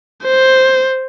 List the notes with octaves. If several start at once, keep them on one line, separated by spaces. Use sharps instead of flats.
C5